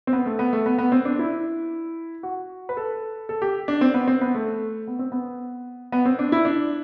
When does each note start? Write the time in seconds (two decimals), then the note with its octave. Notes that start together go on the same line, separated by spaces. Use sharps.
0.07 C4
0.13 B3
0.26 A3
0.39 B3
0.53 A3
0.66 B3
0.78 B3
0.92 C4
1.05 D4
1.19 E4
2.23 F#4
2.69 B4
2.77 A4
3.29 A4
3.42 G4
3.68 D4
3.81 C4
3.94 B3
4.08 C4
4.21 B3
4.34 A3
4.88 B3
4.99 C4
5.12 B3
5.92 B3
6.05 C4
6.19 D4
6.32 E4
6.45 D4